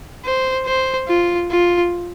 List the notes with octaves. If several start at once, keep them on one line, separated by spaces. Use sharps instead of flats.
C5
C5
F4
F4